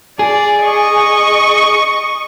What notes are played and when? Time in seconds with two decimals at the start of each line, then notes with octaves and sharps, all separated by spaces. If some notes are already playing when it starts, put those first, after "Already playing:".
0.19 G#4 D5
0.64 D#5 C#6